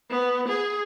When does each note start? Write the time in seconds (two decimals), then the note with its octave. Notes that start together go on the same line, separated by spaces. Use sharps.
0.10 B3
0.48 G#4